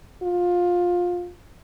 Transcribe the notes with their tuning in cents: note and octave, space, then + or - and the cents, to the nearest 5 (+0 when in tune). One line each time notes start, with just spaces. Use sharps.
F4 +20